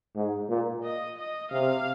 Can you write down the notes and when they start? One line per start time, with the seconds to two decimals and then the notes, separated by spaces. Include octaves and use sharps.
0.16 G#2
0.49 A#2
0.84 D#5
1.18 D#5
1.51 C3 F5